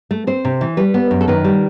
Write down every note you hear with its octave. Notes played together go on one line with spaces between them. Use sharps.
A3
C4 C5
C3
E3
G3 B4
B3
F#2
A4
D#3 B4
G3